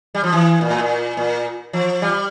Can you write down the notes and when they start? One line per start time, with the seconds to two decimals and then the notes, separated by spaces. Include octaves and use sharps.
0.15 G3
0.24 F3
0.33 E3
0.61 A#2
0.70 A2
0.80 A#2
1.17 A#2
1.73 F3
2.02 G3